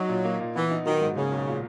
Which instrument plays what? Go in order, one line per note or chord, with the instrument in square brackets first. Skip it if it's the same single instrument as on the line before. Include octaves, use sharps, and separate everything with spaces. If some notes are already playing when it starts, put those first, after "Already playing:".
Already playing: [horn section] F#3 [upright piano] D#4
[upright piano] A#2
A#3
A#2
[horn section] E3 [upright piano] B3
[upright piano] D#4
[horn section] D#3 [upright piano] F#3
[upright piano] G#2
[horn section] C#3 [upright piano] A#3
[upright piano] B1
A#2